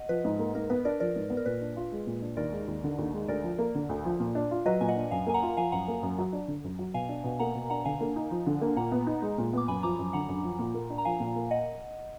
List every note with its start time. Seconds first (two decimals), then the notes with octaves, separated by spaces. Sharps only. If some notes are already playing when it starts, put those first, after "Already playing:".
Already playing: D#5 F#5
0.09 F3 B4
0.25 G#2
0.39 A#3
0.55 G#2 A#4
0.70 B3 B4
0.85 D4 A#4 D5
1.00 F3 A#4 D5
1.16 G#2
1.30 B3
1.37 A#4
1.46 A#2 B4
1.61 D4
1.76 F4
1.92 G#3
2.07 A#2
2.22 D4
2.37 D#2 A#4 D5
2.52 G#3
2.68 D#2
2.84 D3
2.98 D#2
3.13 G#3
3.28 D2 A#4 D5
3.44 F3
3.58 A#3
3.75 D3
3.89 D2
4.05 F3
4.20 A#2
4.35 D4
4.51 F4
4.66 F#3 B4 D#5
4.81 A#2 G#5
4.88 D#5 F#5
4.96 D4
5.11 F#2 F5 G#5
5.27 A#3 G#5
5.34 F#5 A#5
5.42 F4
5.57 F3 F5 G#5
5.72 F#2 F#5 A#5
5.88 A#3
6.03 F#2
6.18 F#3
6.33 D4
6.48 D3
6.64 F#2
6.79 F#3
6.94 B2 F5 G#5
7.09 D4
7.24 B2
7.39 A#3 F#5 A#5
7.55 B2
7.70 D4 F#5 A#5
7.85 D3 F5 G#5
8.00 A#3
8.16 D#4
8.31 F3
8.46 D3
8.62 A#3
8.76 A#2 F#5 A#5
8.92 B3
9.07 D#4
9.22 G#3
9.38 A#2
9.53 B3 D6
9.68 F#2 G#5 B5
9.83 F3 A#5 D6
9.99 F#2
10.13 D3 F#5 A#5
10.28 F#2
10.44 F3
10.59 A#2
10.74 A#3
10.90 D4
10.98 A#5
11.05 F3 F5 G#5
11.20 A#2
11.36 A#3
11.51 D#5 F#5